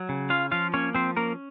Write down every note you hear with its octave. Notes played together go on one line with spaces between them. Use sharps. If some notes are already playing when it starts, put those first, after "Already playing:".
Already playing: F#3
C#3
C#4 F4 F5
F3 F4 F5
A#3 C#4 C#5
F3 C4 C5
A#3 C#4 A#4